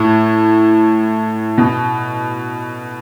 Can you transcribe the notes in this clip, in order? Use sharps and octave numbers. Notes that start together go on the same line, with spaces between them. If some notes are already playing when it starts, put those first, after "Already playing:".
Already playing: A2
B2